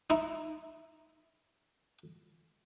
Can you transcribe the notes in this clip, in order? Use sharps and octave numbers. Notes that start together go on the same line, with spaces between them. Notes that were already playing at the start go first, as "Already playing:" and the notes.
D#4 E4